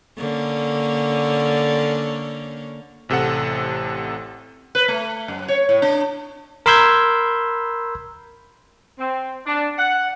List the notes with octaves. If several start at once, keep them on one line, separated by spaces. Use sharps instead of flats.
D3 A#3 C#4
A1 C3 A4 F#5
B4
A3
F#2
C#5
A2
D4
A#4 B5 C6 E6 G6 G#6
C4
D4
F#5